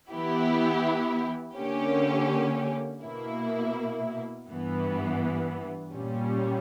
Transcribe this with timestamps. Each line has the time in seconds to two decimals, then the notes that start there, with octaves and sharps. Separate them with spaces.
0.11 E3 B3 E4 G4
1.56 D3 A#3 C#4 G4
3.02 B2 A#3 E4
4.48 G2 E3 B3
5.93 A#2 G3 C#4